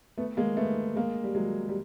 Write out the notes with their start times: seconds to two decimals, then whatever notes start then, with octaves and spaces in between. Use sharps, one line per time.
0.18 A3 B3
0.37 G#3 A#3
0.57 A3 B3
0.96 G#3 A#3
1.24 G3
1.35 F#3 G#3
1.69 G3